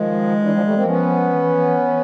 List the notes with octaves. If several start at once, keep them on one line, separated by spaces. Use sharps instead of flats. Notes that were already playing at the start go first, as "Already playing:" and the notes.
Already playing: D#3 F3 G#3
D3 E3
F3 G3
G3 A3
A#3 C4
F3 B3 C#4
E3
E3